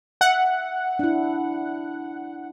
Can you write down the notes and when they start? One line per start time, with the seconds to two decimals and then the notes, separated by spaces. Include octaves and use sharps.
0.21 E5 F#5
0.99 D4 E4